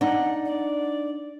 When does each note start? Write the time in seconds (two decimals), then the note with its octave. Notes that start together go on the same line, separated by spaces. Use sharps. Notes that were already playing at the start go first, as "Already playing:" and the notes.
0.01 D4 D#4 F#5
0.45 D5